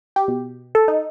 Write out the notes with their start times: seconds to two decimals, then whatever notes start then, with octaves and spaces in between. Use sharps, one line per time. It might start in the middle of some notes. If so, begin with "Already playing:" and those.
0.16 G4
0.28 B2
0.75 A4
0.88 D#4